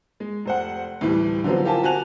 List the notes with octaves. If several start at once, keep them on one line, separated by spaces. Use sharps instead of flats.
G#3
F1 C5 F#5
D2 A2 E3 G3
D3 F3 F#3 B3 C4
E4 F4 G4 A#4 G#5 A5
C4 F#4 G#5 A5 F#6 F7